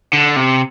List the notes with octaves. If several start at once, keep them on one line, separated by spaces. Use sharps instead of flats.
D3
C3